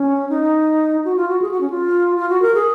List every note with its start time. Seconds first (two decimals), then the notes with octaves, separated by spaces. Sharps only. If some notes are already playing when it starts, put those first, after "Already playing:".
Already playing: C#4
0.29 D#4
1.05 F#4
1.16 F4
1.29 F#4
1.42 G#4
1.51 F#4
1.61 C#4
1.70 F4
2.17 F4
2.30 F#4
2.42 A#4
2.55 G#4